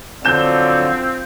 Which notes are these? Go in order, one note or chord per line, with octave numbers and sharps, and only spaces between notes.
D3 F3 F#3 C4 D4 G6 E7